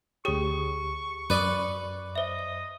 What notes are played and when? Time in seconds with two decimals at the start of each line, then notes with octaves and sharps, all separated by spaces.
0.25 D2 G4 G#4 C#5 C#6 D#6
1.30 F#2 B4 D5 D#6 D#7
2.15 C5 D#5 E5